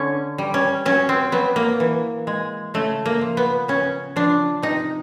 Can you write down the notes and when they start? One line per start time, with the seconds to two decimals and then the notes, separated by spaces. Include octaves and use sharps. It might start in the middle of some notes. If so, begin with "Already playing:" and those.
Already playing: D3 C#4
0.38 G3
0.54 C#4
0.85 F#3 C#4
1.09 C4
1.32 F#3 B3
1.56 A#3
1.80 E3
2.27 G#3
2.74 C#3 A3
3.06 A#3
3.21 F3
3.37 B3
3.68 C#3 C#4
4.16 F3 D4
4.62 C3 D#4